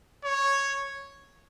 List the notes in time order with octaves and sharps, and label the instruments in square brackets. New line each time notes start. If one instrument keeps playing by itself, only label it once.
[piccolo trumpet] C#5